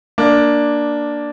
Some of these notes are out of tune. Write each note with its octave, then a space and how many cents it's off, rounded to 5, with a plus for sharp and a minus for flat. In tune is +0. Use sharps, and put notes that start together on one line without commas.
A#3 +5 D4 +0